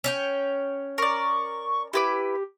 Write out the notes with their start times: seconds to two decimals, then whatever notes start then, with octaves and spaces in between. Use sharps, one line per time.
0.04 C#4 C#5 G5
0.98 A#4 D5 C#6
1.93 E4 G4 B4 D6